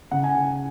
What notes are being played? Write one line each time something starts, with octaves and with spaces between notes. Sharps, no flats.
C#3 F#5
G#5